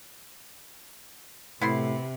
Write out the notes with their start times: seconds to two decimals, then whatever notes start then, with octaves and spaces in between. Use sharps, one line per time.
1.61 A2 C3 B3 E4 C6